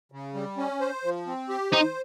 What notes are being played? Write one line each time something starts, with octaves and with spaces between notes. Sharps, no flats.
C#3
G3
C#4
C5
F3
C4
G4
D#4 C5